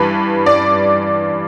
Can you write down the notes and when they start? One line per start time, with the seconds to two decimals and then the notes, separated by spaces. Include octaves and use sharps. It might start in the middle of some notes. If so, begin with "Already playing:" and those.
Already playing: G2 E3 G3 B4
0.46 D5